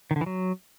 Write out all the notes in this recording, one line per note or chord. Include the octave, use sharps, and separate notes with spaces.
D#3
D3
E3
F#3